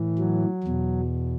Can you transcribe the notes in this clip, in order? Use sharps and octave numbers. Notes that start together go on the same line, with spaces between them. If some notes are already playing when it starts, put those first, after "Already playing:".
Already playing: A2 E3
F#3
E2 B2